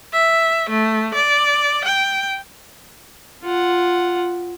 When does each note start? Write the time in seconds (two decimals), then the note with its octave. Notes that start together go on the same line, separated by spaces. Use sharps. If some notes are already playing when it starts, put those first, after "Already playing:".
0.13 E5
0.70 A3
1.14 D5
1.85 G5
3.43 F4 F#5